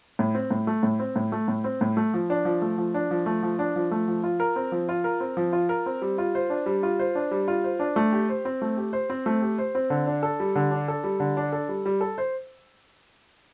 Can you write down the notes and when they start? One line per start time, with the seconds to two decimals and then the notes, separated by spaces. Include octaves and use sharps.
0.19 A2
0.35 C4
0.51 A2
0.67 A3
0.83 A2
1.00 C4
1.16 A2
1.32 A3
1.48 A2
1.64 C4
1.81 A2
1.97 A3
2.14 F3
2.30 D4
2.45 F3
2.62 A3
2.78 F3
2.94 D4
3.11 F3
3.26 A3
3.43 F3
3.59 D4
3.76 F3
3.91 A3
4.08 F3
4.24 F4
4.40 A#4
4.56 C4
4.72 F3
4.89 F4
5.04 A#4
5.20 C4
5.37 F3
5.53 F4
5.69 A#4
5.86 C4
6.02 G3
6.18 F4
6.35 C5
6.50 D4
6.66 G3
6.83 F4
6.99 C5
7.15 D4
7.31 G3
7.48 F4
7.64 C5
7.80 D4
7.96 A3
8.13 G4
8.29 C5
8.45 C4
8.62 A3
8.77 G4
8.93 C5
9.10 C4
9.26 A3
9.42 G4
9.58 C5
9.75 C4
9.90 D3
10.07 D4
10.23 A4
10.40 G3
10.55 D3
10.71 D4
10.88 A4
11.04 G3
11.20 D3
11.37 D4
11.53 A4
11.69 G3
11.86 G3
12.01 A4
12.18 C5